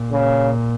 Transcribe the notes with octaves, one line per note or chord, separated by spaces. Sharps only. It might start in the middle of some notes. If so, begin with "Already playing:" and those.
Already playing: A#2
C#3